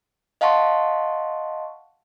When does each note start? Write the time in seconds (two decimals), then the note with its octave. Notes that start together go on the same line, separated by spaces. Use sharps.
0.41 D#5 F5 F#5 A5 C6 C#6